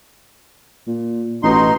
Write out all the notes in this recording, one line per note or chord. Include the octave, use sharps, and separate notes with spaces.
A#2
A1 B2 D#4 C6